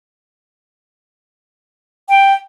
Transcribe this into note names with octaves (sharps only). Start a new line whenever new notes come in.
G5